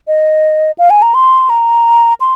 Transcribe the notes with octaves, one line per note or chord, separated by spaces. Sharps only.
D#5
F5
G#5
A#5
C6
A#5
C6